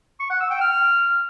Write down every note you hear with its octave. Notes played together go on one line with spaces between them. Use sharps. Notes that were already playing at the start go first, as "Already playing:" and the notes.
C#6
F#5
E6
G5
F6